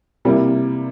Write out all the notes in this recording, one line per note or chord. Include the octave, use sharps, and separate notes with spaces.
C3 G3 A#3 E4